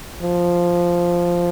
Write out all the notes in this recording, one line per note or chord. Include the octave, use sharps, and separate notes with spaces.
F3